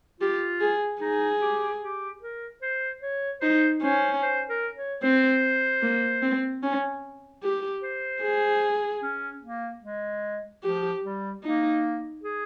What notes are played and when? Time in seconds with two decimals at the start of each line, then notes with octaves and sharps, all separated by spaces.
0.20 F4 G4
0.61 G#4
1.01 D#4 G#4
1.41 G4
1.81 G4
2.21 A#4
2.62 C5
3.02 C#5
3.41 D#4 C5
3.82 C#4 C5
4.22 C5
4.49 A#4
4.76 C#5
5.02 C4 C5
5.82 A#3
6.22 C4
6.63 C#4
7.43 G4
7.83 C5
8.22 G#4
9.03 C#4
9.43 A#3
9.83 G#3
10.63 F3 G4
11.04 G3
11.43 A#3 D#4
12.24 G#4